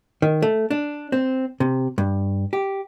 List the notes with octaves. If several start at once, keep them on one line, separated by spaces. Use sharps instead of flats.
D#3
A3
D4
C4
C3
G2
G4